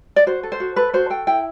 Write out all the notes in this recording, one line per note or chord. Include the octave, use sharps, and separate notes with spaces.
D5
F#4 C5
A4
C5
F#4
A4 B4
F#4 C5
A4 G5
E4 G5